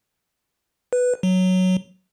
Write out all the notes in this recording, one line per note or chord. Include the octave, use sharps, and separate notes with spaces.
B4
F#3